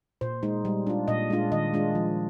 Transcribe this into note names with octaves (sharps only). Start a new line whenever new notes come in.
A#2 C5
G#3 D#4
G3
D4 F4
A#2 D#5
G#3 D4 F4
D#3 D#5
G#3 D4 F4
F3